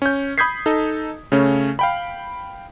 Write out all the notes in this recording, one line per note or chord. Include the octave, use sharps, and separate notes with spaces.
C#4 G6
B5 D#6 G6 G#6 B6 C7
D#4 A4 D#5
C#3 A3 C#4
F5 G5 B5